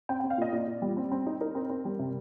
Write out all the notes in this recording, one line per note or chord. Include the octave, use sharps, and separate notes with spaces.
C4 G5
C4 G5
F5
A#2 D#5
A#2 D5
A#2
G3
C4
C4
D#4
D#4 A#4
C4
C4
G3
C3